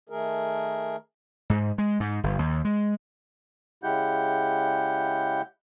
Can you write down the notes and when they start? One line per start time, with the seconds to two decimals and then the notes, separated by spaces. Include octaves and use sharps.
0.09 D#3 A3 G#4 A#4
1.50 G#2
1.78 G#3
2.00 G#2
2.24 G1
2.39 D#2
2.65 G#3
3.83 C#3 G#3 E4 G4 F#5 G6